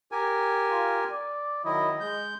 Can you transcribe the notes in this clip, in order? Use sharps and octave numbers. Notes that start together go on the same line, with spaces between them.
G4 A#4 G#5
F4
D5
D#3 F#3 E4 D#5
G#3 G6